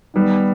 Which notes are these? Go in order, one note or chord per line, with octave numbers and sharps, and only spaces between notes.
D#3 G3 B3